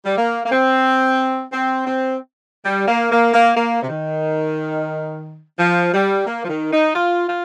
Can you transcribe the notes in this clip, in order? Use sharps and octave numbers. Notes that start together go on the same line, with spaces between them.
G3
A#3
A#3
C4
C4
C4
G3
A#3
A#3
A#3
A#3
C3
D#3
F3
G3
A#3
F3
D#3
D#4
F4
F4